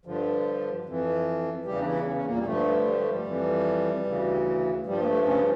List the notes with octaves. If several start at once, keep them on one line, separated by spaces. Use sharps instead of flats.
G2 D3 F3
F2 E3
E2 C#3 E3 G3 G4
D4
E3 E4
C#3 C#4
C#4
A#2 A#3
G3
G2 D3 F3 A3
G3
A3
G3
F2 E3
D2 C#3 E3
G2 F3 G3
A#3
A3
C#3 C#4